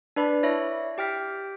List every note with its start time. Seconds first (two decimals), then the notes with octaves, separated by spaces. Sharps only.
0.16 D4 B4 D5 B5
0.43 E4 C#5 E5 A#6
0.98 G4 G5 F6 B6